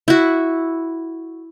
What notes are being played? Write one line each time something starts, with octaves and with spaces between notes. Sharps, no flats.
E4 F#4